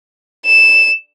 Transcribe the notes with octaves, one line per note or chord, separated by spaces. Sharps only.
E7